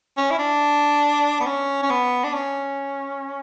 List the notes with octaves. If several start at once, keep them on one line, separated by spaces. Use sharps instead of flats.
C#4
E4
D4
B3
C#4
C#4
B3
D4
C#4